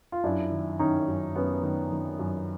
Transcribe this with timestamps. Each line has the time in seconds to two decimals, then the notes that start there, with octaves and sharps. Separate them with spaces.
0.12 F4
0.24 F#2 D4 E4
0.51 D#3
0.79 D#3 C#4 D#4
1.08 F#2
1.35 F#2 B3 C#4
1.63 D#3
1.92 D#3
2.19 F#2